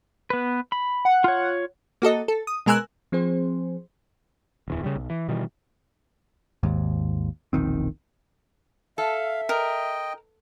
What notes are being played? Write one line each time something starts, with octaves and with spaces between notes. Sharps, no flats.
B3 B4
B5
F#5
F4 C#5
A#3 F#4 A4 D#5
A4
D#6
B2 G#3 A#4 G#5 E6 F#6
F3 C4 G#4 C5
D1 E2 E3
C#3 G3
B1
E3
B2 D#3 E3 G3
G#1 D#2 G#2
E1 A#1 D#3 C4
A4 E5 F5
A#4 D#5 G5